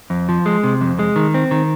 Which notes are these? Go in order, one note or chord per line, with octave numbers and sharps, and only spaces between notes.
F2
F3
G#3
C3
F2
G#3
D#3
C4
D#3